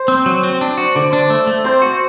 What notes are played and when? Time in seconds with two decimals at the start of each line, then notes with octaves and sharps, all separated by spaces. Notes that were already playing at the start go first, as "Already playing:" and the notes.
Already playing: C5
0.08 C4
0.26 F#3
0.43 C4
0.61 D4
0.77 F#4
0.95 D3 D5
1.13 D4
1.30 A3
1.47 A3
1.64 C4 C5
1.82 F#4